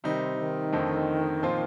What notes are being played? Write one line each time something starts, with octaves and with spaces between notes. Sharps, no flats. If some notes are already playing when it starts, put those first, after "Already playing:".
C3 D#3 G3 C4 D#4
D#3
F2 D3 A3 C4 D#4
A#2 F3 C4 F4